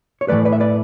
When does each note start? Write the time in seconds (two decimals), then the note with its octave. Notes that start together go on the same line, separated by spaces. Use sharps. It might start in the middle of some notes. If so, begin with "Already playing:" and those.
0.21 C#5
0.28 A2 E3 A3 B4 D5
0.45 B4 D5
0.52 E5
0.60 B4 D5